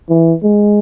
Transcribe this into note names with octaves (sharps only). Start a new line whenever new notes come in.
E3
G#3